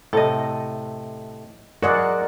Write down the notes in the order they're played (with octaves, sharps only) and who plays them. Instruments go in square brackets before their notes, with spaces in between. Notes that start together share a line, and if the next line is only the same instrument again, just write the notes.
[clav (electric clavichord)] A2 C3 [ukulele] A4 D#5
[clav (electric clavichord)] F#3 G#3 F#4 [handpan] A#4 D5 F#5